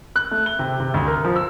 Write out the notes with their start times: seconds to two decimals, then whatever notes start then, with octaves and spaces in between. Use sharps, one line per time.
0.16 F#6
0.31 A3
0.46 G7
0.59 C3
0.80 C3
0.94 D2
1.07 A#4
1.25 F3
1.36 E6